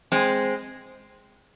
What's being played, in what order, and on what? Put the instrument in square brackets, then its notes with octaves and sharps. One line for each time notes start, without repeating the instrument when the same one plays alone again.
[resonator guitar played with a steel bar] G#3 C4